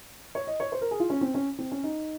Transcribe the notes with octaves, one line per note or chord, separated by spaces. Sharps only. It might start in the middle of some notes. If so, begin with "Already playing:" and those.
C#5
D#5
C#5
C5
A#4
G#4
F4
C#4
C4
C#4
C4
C#4
D#4